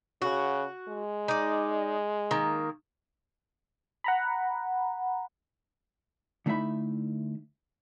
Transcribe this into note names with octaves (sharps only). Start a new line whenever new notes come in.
C#3 F#4
G#3
D#4 D5
D#3 A#3
F#5 A#5 B5
D3 A3 D#4 E4 E5 B5